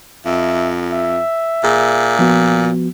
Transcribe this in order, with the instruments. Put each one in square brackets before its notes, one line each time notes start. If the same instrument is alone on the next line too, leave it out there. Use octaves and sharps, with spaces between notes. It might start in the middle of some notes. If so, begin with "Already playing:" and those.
[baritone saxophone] F2 [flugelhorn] E5
[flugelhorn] E5
[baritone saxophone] A#2 [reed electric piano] G#4
[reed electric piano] F3 B3 F#4